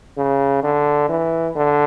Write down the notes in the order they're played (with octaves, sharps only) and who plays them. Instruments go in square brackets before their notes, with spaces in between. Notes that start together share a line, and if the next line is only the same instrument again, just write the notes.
[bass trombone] C#3
D3
E3
D3